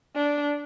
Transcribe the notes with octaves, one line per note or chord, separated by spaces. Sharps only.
D4